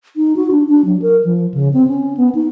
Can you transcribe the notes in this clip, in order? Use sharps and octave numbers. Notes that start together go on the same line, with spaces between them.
D#4
F#4
D4
D4
F#3
A#4
F3
C#3
C4
C#4
B3
D#4